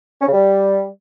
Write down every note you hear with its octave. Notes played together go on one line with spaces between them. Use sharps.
C#4
C#3
G3